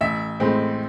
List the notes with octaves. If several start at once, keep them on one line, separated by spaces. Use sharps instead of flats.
A1 E5
A2 G#3 C4